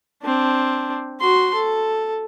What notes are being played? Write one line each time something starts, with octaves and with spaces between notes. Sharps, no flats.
C4 D4
F#4 C6
A4